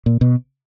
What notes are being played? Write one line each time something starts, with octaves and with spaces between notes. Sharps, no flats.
A#2
B2